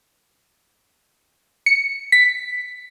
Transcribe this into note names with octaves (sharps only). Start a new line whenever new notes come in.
C#7
B6